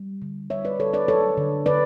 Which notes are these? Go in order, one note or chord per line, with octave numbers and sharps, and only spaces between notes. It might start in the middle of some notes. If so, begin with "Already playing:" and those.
Already playing: G3
D3
G3 C#5 E5
B4 D5
D3 A4 C#5
B4 D5
F#3 A4 C#5
D3
D3 B4 D5